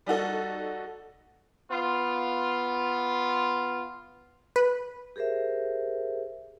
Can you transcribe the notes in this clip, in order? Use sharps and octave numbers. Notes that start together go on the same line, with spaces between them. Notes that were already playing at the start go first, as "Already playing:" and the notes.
G3 D#4 F#4 A4
B3 F4
B4
G4 G#4 A#4 C5 E5